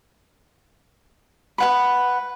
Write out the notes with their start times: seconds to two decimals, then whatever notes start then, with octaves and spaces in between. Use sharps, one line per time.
1.58 B4 F#5 B5